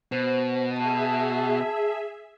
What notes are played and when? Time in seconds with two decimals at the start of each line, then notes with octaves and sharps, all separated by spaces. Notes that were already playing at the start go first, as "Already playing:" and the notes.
0.12 B2 C5
0.76 G#4 E5 A5